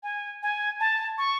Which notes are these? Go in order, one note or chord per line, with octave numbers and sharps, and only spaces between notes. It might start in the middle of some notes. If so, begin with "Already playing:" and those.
G#5
G#5
A5
C#6